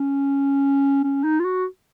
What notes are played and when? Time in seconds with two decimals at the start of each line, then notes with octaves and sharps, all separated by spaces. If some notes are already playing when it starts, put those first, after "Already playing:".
Already playing: C#4
1.04 C#4
1.24 D#4
1.40 F4
1.44 F#4